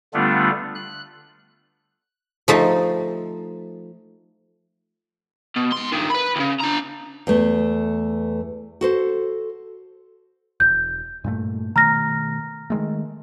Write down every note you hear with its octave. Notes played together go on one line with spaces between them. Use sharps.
D3 G3 A3 B3 D4 F4
F#6
F3 A3 D#4
B2
G#2 C6
G2 D#3
B4 B5
D#2 C#3
D4 A#5
E2 A3
F#4 A4 C5
E1 G6
G2 A#2 A3
B2 D#3 A3 A#5 F6 A#6
D#3 G#3 A3